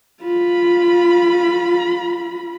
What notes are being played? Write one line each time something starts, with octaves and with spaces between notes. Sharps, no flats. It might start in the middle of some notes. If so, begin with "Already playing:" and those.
F4 B5